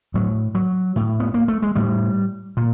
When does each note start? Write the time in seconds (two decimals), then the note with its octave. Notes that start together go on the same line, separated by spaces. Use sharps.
0.14 A2 F#3
0.55 F#3
0.96 A2
1.20 B3
1.34 A#3
1.48 A3
1.62 G#3
1.75 A2 G3
2.57 A#2